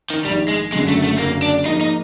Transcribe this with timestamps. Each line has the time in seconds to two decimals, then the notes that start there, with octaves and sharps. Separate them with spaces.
0.10 D#3
0.25 A#1 G#2 D#3 G3
0.48 G#3
0.73 F#1 F#2 D3 F#3 G#3
0.88 A3
1.04 A3
1.18 F#1 F#2 D3 F#3 A#3
1.42 D4
1.65 G#2 F3 A#3 D#4
1.81 D#4